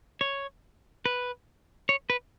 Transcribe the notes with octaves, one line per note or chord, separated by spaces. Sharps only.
C#5
B4
C#5
B4